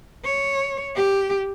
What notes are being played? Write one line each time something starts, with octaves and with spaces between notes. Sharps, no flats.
C#5
G4